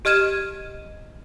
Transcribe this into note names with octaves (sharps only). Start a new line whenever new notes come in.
G4 D#5 F6 G#6 D#7 E7